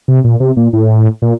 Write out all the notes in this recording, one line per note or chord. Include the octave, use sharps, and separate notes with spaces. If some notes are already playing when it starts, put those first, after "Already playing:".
C3
A#2
C3
A#2
A2
A#2